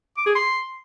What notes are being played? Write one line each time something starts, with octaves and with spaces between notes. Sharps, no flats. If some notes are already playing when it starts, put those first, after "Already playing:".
D6
G#4
C6